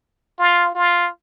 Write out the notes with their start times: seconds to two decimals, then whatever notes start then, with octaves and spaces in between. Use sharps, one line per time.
0.39 F4
0.75 F4